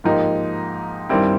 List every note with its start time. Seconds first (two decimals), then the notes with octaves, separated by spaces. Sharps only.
0.04 G#2 F3 A#3 D#4 G4
1.09 G2 D#3 G3 C4 E4